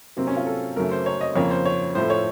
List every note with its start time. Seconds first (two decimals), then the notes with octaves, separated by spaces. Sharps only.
0.17 C3 F#3 A#3 C4
0.27 C#4
0.37 F4
0.46 A4
0.76 F#2 C#3 F#3 A3 A#4
0.91 C5
1.06 C#5
1.21 D#5
1.36 F2 C#3 F3 A#3 C#5
1.51 C5
1.65 C#5
1.95 A2 F3 A3 C5
2.10 C#5